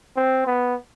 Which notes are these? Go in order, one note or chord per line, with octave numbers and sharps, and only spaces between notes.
C4
B3